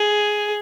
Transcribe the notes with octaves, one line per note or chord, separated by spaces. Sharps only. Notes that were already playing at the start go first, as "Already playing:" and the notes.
Already playing: G#4